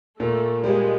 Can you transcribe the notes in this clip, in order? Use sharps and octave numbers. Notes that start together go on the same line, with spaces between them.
A#2 A3
G3 G#3 A#3